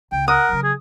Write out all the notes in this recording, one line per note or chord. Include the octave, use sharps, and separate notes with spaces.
C#2 G5
A#4 F#5 D#6
C#3 F#3
G#4